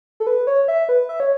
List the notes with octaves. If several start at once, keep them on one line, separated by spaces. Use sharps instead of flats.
A4
B4
C#5
E5
B4
E5
C#5